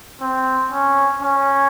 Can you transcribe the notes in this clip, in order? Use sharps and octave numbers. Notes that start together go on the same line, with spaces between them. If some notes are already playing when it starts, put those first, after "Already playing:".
C4
C#4
C#4